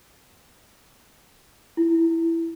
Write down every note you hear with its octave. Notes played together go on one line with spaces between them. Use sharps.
E4